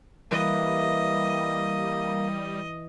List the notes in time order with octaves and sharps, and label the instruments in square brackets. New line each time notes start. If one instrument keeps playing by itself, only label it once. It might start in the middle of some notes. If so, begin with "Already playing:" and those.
[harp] E3 [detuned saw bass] G3 [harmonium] A#3 [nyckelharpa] D#5